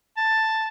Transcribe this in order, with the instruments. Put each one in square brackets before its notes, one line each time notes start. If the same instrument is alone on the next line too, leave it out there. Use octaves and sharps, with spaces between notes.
[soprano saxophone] A5